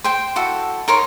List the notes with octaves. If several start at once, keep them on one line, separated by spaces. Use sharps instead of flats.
C5 G5
E4 F#4 A4
D#4 A#4 C#5 C6